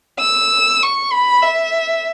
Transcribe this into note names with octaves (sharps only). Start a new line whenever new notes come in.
E6
C#6
B5
E5